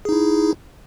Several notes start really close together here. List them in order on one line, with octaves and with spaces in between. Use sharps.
G#4 D#4 E4